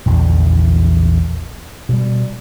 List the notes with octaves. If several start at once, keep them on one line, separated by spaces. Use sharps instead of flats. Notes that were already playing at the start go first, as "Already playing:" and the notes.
A#1 E2 D3 E3
B2 G3